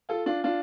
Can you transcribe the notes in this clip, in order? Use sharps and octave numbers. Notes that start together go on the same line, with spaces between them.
F4 A4
D4 F4
D4 F4